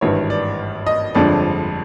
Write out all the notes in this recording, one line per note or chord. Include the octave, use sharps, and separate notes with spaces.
G#1 G2 E3 C#5
D5
D#5
G1 F2 D3 F3 G#3 D5